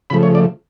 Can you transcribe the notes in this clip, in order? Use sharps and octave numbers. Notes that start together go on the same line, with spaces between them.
C#3 F3 A3 B5
C#5
D5